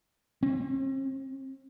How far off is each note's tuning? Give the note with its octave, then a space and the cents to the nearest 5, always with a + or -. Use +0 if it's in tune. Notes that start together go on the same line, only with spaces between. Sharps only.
C4 +45